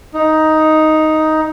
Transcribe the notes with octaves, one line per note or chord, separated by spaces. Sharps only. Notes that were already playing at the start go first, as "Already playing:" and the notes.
D#4